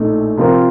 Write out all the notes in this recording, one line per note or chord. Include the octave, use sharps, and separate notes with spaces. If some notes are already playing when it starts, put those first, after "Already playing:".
Already playing: A#1 A2 A3 D#4
C3 F3 C4 F4 A#4